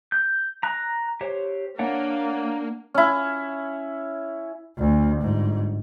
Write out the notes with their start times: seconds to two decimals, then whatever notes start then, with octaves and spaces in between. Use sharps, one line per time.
0.12 G6
0.63 A#5 F#6
1.21 G4 C5 C#5
1.79 A#3 D4 C#5 F#5
2.94 C#4 E4
4.78 D2
5.21 G1 G#2